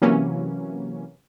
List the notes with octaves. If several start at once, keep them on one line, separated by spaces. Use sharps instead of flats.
C3 E3 F#3 A#3 C#4